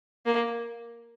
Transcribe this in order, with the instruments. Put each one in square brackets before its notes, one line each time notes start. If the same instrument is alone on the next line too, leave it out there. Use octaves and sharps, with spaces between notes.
[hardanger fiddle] A#3